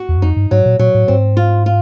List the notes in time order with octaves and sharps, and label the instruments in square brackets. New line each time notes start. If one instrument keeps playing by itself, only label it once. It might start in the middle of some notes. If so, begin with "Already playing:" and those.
Already playing: [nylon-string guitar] F#4
[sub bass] E2
F#2
[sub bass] F2 [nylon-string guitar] D#4
[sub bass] G2
[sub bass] G#2 [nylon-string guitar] F#3
[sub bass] A#2
[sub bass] A#2 [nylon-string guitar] F#3
[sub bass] A2
[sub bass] G#2 [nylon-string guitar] C4
[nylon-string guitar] F4
F4